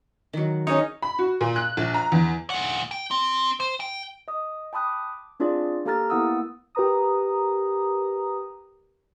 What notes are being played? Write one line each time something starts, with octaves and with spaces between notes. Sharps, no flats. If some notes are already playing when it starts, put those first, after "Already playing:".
D#3 F#3
C#4 D#4 G#4 C#5
B5
F#4
A#2
F#6
A#1
A#5
E2
A#2 F#5
G5
C4
C5
G5
D#5 D#6
G5 A5 B5 D#6 F#6
D6
C4 D4 F4 G#4 D5
A#3 G4 A4 A#5 F6 A6
A#3 B3 E4 F#5 D#6 E6
G4 A#4 B4 A#5 D#6